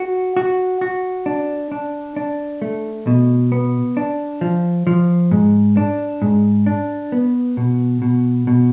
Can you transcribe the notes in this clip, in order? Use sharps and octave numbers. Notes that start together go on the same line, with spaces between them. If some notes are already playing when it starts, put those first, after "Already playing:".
Already playing: F#4
F#4
F#4
D4
D4
D4
A3
B2
B3
D4
F3
F3
G#2
D4
G#2
D4
B3
B2
B2
B2